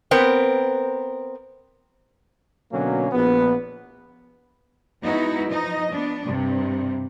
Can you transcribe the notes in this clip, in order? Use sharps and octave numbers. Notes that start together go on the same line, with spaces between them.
B3 C4 A#4
B2 D3 F#3 A#3 C#4
A#1 B3
G#3 B3 D#4 E4 F#4
F3 D#4 D#5
B3 D4
G2 C3